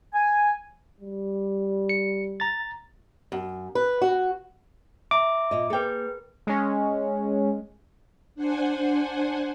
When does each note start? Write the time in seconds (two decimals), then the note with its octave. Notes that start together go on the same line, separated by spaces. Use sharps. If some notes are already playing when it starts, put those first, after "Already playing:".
0.14 G#5
1.01 G3
1.89 C#7
2.40 A#5 A6
3.32 F#2
3.75 B4
4.02 F#4
5.11 E5 A#5 D6
5.51 A#2 D#5
5.70 A#3 G#4 A#4 B4 G5
6.47 G#3 C#4
8.35 D4 C5 F#5 G#5